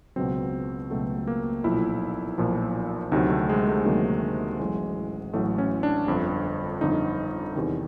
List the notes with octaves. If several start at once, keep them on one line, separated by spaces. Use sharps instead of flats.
C#2 B2 F#3 C4
C#2 B2 F#3 A3
A#3
B1 A#2 F3 E4
B1 A#2 F3
D2 C3 D#3 F#3 D#4
A3
G#3
A3
D2 C3 D#3 F#3 A#3
A1 A2 F#3 G#3
A1 A2 F#3 A3
C#4
D4
G1 F2 D3
G1 F2 D3 D#4
E2 C3 D#3